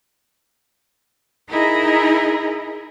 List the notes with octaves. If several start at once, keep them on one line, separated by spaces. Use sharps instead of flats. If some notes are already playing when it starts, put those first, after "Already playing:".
D#4 E4 G#4 A#4 D#5